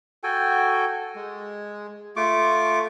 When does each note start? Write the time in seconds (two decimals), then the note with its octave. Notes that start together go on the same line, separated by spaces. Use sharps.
0.23 F#4 A4 G5 G#5
1.16 G#3
2.16 A3 F4 C#6 D6